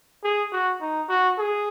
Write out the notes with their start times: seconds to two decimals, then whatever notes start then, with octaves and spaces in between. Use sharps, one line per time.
0.24 G#4
0.52 F#4
0.81 D#4
1.09 F#4
1.38 G#4